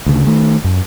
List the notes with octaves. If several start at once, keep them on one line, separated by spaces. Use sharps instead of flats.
D2 C#3
D#3 A3
F#2